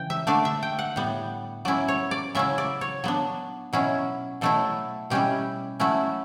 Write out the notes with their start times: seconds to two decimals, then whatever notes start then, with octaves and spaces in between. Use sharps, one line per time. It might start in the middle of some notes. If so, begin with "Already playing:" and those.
Already playing: C#3 E3 G5
0.10 E5
0.27 D3 A3 D4 D5
0.45 E5
0.63 G5
0.79 F#5
0.96 A2 G3 B3
1.65 F#3 C#4 E4 D5
1.88 C#5
2.11 D5
2.35 C#3 F#3 C#4 E4 E5
2.58 D5
2.81 C#5
3.04 F#3 B3 D4
3.73 B2 F#3 C#4 E4
4.41 B2 F#3 A3 E4 A4
5.10 B2 G3 C#4 E4 G4
5.80 F#3 A3 C#4 E4